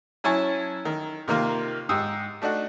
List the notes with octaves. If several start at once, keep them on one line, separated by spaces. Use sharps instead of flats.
F#3 C#4 E4 G#5 A5 C#6
D#3
C3 D#3 A#3 F4
G#2 G4 D#6 E6
A3 D4 D#4 F#4